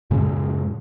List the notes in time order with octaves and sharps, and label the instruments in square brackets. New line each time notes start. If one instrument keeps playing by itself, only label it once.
[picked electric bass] F#2 A2 C#3 G#3